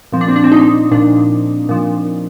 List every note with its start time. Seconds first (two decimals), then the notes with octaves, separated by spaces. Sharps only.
0.12 A#2 F3 C4
0.21 D4
0.28 C4
0.36 D4
0.44 C4
0.52 D#4
0.91 A#2 F3 D4
1.69 A#2 F3